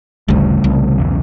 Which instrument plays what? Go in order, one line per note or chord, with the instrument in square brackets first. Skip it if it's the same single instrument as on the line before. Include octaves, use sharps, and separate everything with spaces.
[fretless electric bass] G1 D2 [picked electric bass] C#3 G3 A3
[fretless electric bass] C2
[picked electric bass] B1 E2 C#3